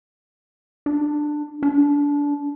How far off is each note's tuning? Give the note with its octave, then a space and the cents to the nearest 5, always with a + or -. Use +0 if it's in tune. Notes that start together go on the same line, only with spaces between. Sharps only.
D4 +15
D4 -25